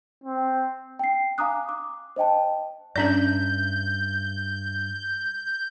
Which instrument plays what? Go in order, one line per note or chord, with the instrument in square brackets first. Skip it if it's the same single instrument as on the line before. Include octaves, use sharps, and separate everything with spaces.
[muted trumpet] C4
[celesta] G5 C7
F5 G#5 A#5 D6 D#6 F#6
D6
C5 D#5 G5 A5
[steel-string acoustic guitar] G2 E5 [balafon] C#4 D4 D5 [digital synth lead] G6